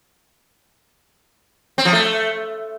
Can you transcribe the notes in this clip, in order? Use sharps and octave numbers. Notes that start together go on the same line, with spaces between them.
C4
F3
A3